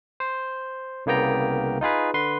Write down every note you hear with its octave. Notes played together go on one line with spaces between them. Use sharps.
C5
C2 C#3 A#3 B3 G5 A#5
D#4 F4 G#4 B4
D3 B4 C6